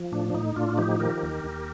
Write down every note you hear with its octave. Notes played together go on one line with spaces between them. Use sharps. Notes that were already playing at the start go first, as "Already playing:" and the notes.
Already playing: F3
A2 D4
D4
A2 D#4
A2 D4 F4
F3 D#4 G4
D#3 G4 A#4
D#2
D#2